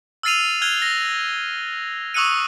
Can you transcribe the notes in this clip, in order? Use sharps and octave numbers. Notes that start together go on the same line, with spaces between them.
E6 F6 A6 C7 D#7 F7
F6 F#6 G#6 F7 G7
A#6
C#6 D#6 E6 F#6 C#7 D#7